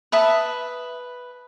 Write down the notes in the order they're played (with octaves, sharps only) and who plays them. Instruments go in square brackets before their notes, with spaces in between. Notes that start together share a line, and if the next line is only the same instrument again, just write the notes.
[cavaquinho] B4 E5 A5 D#6